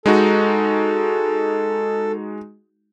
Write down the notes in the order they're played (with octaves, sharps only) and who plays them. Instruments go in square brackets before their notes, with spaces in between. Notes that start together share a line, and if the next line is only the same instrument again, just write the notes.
[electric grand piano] G#3 D#4 F#4 [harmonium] A4